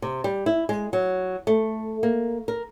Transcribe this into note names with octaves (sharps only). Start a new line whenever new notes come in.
C3
G3
E4
G#3
F#3
A3
A#3
A#4